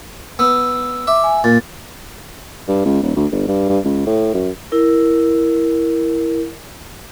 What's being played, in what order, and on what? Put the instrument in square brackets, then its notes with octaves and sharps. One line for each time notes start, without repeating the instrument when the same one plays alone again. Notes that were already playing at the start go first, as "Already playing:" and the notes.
[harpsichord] B3 [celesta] E6
[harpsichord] E5 [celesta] D6
[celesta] G#5
[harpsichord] A#2 [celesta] A6
[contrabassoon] G2
C#2
D#1
D2
G1
G2
G2
C#2
A2
F#2
[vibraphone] E4 A#4